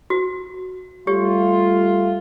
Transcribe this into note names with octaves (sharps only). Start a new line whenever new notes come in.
F#4
G3 A3 F4 G4 C#5